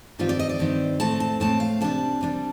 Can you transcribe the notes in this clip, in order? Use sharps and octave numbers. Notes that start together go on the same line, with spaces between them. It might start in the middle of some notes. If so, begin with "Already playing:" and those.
G2 D#3 G3 C4 F4
D5
D#5
D5
G2 D#3 G3 C4
A2 A3 C4 A5
A5
A2 A3 C4 A5
F5
C3 G3 D4 A5
C3 G3 D4